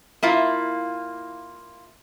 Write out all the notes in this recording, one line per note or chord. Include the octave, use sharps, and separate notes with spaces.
A#3 E4 F4